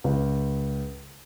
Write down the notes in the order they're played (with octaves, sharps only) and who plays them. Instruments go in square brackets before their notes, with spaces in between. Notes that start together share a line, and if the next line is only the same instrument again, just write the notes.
[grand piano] C#2